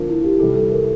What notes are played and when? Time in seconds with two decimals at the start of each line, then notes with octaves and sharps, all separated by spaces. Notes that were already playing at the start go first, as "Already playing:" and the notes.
Already playing: D3 F3 A#3 F4
0.09 E4
0.24 G4
0.40 C3 E3 G3 A4
0.55 A4
0.72 A#4